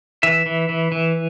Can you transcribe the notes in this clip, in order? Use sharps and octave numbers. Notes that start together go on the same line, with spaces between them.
E3 E5
E3
E3
E3